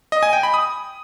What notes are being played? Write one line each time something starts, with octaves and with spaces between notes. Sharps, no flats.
D#5
G#5
G5
B5
D#6